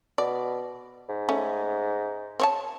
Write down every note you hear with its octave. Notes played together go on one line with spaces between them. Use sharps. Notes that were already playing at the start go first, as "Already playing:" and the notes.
B2 D5
G#2
A3 C#4
C4 C#5 A5